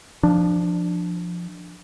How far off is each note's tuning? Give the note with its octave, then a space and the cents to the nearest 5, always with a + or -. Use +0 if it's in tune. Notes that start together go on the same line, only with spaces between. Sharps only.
F3 +0 D4 +10